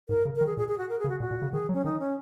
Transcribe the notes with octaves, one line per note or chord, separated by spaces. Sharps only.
G#2 A#4
C#3
A#4
D#3
G#4
A#2 G#4
G#4
F#4
A#4
G#4
C#3
F#4
A#2 F#4
A#2
C#3
D#3 G#4
F#3
C#4
D#3 D#4
C#4